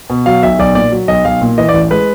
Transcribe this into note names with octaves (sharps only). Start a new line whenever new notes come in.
B2
F#3 F5
B1 E5
B1 D5
A#2 D5
F#3
B1 D#5
B1 F5
A#2
E3 D#5
D5
A1
G#3 B4